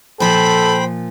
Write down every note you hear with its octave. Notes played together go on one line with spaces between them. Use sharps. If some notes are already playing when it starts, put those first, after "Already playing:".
A#2 F3 A4 C5 G5 B5